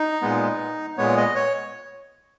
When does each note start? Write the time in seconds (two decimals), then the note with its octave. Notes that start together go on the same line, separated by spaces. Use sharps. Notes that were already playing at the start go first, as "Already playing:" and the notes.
Already playing: D#4
0.22 A#2 G#3 B3
0.97 A#2 G#3 B3 C#5
1.17 D#5
1.36 C#5